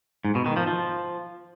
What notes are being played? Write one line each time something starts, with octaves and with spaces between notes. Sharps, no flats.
G#2
B2
D#3
F3
F3